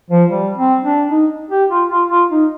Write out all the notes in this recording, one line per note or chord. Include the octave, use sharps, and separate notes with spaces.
F3
G3
C4
D4
D#4
G4
F4
F4
F4
D#4